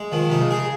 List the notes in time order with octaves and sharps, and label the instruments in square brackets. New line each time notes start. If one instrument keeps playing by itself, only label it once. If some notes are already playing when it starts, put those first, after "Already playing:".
Already playing: [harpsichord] G#3
[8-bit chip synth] D#3 [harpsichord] F3
[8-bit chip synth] C3 [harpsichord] D#4
[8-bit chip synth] C#3
[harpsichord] G#4